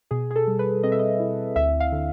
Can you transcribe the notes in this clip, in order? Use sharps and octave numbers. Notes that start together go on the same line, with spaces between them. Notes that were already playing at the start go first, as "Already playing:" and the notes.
B2 G#4
G#4
A4
G3
B4
C4 D#5
E5
D#5
E4
D2 E5
F5
D3